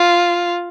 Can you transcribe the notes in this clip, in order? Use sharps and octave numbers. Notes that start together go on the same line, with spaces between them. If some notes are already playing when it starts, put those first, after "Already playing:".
Already playing: F4